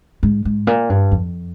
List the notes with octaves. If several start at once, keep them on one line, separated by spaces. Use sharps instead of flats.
G#2
G#2
A#2
G2
F2